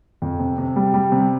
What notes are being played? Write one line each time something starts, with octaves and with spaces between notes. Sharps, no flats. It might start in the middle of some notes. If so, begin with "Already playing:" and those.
F2
C3
C3
G3
G3
C3